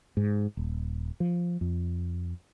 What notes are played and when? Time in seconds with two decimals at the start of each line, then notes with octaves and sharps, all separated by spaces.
0.17 G#2
0.57 D#1
1.20 F3
1.61 F2